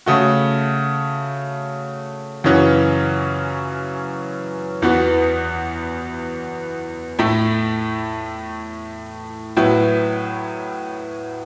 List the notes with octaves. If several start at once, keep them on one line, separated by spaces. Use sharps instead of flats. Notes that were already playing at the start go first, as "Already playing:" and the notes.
C#3 A3 F#4
F#2 C#3 E3 C#4 F#4
E2 E3 B3 F#4
A2 A3 E4
A2 F#3 B3 E4